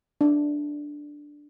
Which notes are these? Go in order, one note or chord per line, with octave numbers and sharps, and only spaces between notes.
D4